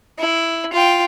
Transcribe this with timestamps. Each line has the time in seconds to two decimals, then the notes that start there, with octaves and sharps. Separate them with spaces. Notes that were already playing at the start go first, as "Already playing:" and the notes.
0.19 E4
0.73 F4 G5